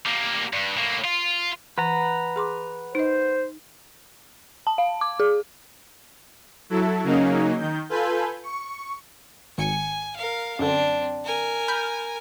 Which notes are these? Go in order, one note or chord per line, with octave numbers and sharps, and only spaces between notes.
G3 A#3
G2
A2 A#3
F4
E3 B4 F#5 A#5
G#4 C6 D6
D#4 C5 D#5
A5
F5
D6
G#4
F#3 E4 A4
C#3 F#3 A#3 C#4 D#4
D#3 G6
F4 A4 B4 G#5 G6
C#6
G#1 G#5 C#7
A#4 F5
F#2 D3 C4 D4
A#4 G#5
B5 F6 G6